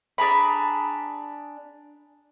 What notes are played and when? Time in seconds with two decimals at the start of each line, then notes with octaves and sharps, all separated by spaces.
0.18 D4 G#4 A#5 B5